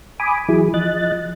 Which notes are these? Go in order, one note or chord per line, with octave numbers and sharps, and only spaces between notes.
G#5 B5 D6 D#6
E3 F#3 E4 G#4
F3 D#5 F#6 A6